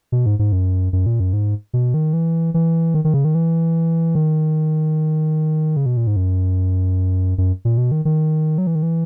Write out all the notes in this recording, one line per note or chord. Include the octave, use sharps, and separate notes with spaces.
B2
G#2
G#2
F#2
F#2
A#2
F#2
G#2
B2
D#3
E3
E3
D#3
D#3
C#3
D#3
E3
D#3
C#3
B2
A#2
G#2
F#2
F#2
A#2
B2
D#3
D#3
F#3
E3
D#3
E3